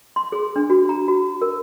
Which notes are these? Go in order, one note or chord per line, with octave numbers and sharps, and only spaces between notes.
C6
G#4
D4
F#4
A#5
F#4
A#4